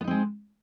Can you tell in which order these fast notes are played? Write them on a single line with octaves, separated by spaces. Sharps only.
B3 D#4 C4 G#3